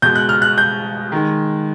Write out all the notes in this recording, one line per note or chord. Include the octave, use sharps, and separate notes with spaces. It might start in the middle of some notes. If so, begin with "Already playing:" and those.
B2 G#3 G6
F#6
F6
F#6
G6
D#3 G#3